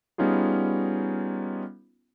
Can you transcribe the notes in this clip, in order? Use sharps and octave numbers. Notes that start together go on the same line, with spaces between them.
G3 B3 C#4 D#4 F4 G#4